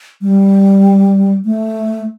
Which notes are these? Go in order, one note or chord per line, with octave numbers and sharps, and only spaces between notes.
G3
A3